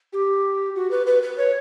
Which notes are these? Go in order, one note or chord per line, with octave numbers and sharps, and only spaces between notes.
G4
F#4
B4
B4
B4
C#5